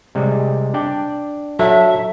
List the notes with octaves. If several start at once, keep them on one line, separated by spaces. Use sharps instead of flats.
C3 G3 G#3
D4 D5 G5
F#3 A4 E5